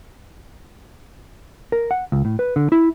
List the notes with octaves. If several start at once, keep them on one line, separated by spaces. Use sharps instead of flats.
A#4
F#5
C#2
A2
B4
D3
E4